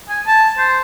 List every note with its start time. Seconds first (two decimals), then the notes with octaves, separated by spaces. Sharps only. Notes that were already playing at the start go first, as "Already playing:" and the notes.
0.09 G#5
0.27 A5
0.58 C5